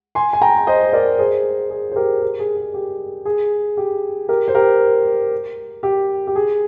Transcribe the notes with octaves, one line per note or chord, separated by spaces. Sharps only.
G#5 C6
G#5
G5 A#5
C5 D#5
A#4 D5
G#4 C5
G#4
C5
G4 A#4
G4
G#4
G#4
G4
G#4
G4
G4 A#4
C5
G4 A#4
G4
G4
G#4